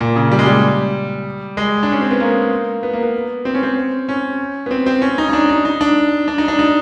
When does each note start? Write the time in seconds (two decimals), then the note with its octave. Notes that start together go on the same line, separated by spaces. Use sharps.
0.01 A#2
0.16 C#3
0.31 G3
0.39 G#3
0.46 G3
1.57 G#3
1.83 D4
1.92 C#4
2.01 C4
2.11 B3
2.20 A#3
2.83 B3
2.93 A#3
3.03 B3
3.45 C4
3.54 C#4
3.63 C4
4.09 C#4
4.66 B3
4.71 C4
4.86 C4
5.02 C#4
5.18 D#4
5.29 D#4
5.33 D4
5.49 D#4
5.65 D#4
5.81 D4
6.28 D4
6.38 D#4
6.48 D4
6.59 D#4